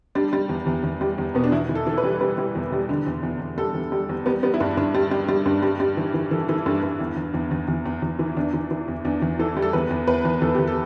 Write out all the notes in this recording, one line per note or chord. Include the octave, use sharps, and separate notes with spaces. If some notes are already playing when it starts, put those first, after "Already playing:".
G3 D4
G3
E2
E2
E2
G3
E2
B2 B3
D4
E2 E4
E3
A4
E3 A4
B4
G3
G3 B4
G3
E2
G3
D3
E2
E2
E2
G3 A4
E2
G3
E2
G3 B3
G3 B3
E4
G2 D4
G2 D4
G3
G3
G3
G2
G3
G3
E3
E3
E3 A4
E3 A4
G2 A4
G2
E2
E2
E2
E2
E2
E2
E2
E3
E2 D4
E3
E3
E2
E2 D4
E2
E3 A4
G3
A4
E2 B4
E2
E2 B4
E2
E2 A4
E2 G4
A4